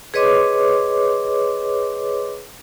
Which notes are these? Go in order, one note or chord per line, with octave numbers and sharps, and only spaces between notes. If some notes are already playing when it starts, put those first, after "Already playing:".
G#4 B4 C#5 D#5 C6 D6